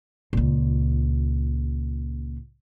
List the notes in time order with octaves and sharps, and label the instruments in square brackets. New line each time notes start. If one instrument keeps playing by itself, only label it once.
[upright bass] C#2 A#2